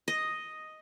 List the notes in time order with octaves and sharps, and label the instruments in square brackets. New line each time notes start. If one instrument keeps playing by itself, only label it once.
[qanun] D#5